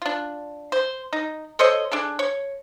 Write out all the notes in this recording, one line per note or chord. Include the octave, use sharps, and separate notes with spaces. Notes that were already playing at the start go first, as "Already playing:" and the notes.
D4 F4
C5
D#4
A4 C5 C#5 D#5
D4 G#4 A4
C#5